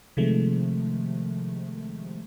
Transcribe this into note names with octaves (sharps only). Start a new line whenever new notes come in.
C3 D#3 F3 G#3 A3